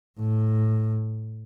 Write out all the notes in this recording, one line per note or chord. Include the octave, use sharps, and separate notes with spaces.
A2